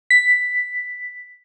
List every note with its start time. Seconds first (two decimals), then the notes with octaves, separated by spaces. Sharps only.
0.10 B6